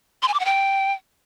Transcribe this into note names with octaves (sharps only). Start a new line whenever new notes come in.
C6
G#5
D6
F#5
G5